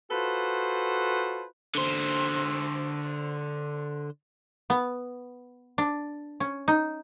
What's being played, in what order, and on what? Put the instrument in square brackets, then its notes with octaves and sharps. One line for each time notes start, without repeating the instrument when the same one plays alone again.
[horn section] F4 F#4 A4 B4 C5
[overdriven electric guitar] D3 C5
[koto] B3
D4
C#4
D#4